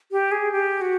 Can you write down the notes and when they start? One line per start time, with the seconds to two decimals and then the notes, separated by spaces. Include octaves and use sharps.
0.11 G4
0.32 G#4
0.52 G4
0.81 F#4